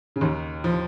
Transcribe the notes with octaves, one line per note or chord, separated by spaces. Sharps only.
C#3
D#2 D#3
F3